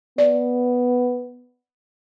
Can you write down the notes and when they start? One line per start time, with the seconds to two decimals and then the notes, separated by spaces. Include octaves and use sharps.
0.18 B3 D5